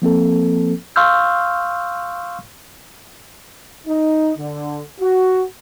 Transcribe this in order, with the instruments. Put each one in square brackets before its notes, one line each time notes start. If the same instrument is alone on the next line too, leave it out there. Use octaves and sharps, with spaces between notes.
[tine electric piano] F3 A#3 C4 A4
F5 C6 C#6 E6 F6 G6
[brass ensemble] D#4
D3
F#4